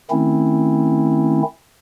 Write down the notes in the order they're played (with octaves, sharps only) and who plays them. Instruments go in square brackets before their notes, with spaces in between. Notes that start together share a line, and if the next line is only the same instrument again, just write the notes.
[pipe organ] D#3 A3 C4 C#4 E4